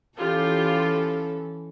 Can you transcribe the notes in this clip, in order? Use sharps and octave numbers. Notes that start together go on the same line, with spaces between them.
E3 C#4 F4 G4 A4